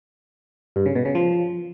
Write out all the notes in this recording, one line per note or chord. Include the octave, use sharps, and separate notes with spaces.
G2
C#3
B2
C#3
F3